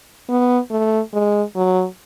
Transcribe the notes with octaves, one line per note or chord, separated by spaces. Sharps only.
B3
A3
G#3
F#3